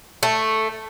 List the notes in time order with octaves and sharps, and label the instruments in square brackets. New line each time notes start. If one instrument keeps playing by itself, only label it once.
[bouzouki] A3